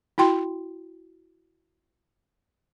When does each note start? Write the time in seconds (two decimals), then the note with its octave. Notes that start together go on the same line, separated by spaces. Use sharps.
0.18 E4 F#4 G5 C6